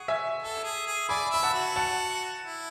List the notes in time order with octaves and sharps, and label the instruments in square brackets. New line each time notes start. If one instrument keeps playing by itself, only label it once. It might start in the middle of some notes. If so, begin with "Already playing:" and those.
Already playing: [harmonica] G#4 [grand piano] F#5 C#6
[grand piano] E5 G#5
[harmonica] A4
G#4
G#4
[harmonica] D5 [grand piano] G#5 B5
[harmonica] E5 [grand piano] B5
[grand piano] F#5 A5
[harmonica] F#4
[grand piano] F#5 A5
[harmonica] E4